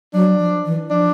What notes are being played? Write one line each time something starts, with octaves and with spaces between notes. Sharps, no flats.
F#3 D4
F3
E3
F3 D4